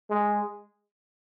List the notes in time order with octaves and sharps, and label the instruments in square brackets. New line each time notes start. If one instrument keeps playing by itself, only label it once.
[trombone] G#3